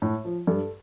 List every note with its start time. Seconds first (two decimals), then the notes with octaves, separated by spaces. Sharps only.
0.02 A2
0.25 F3
0.47 G2 A4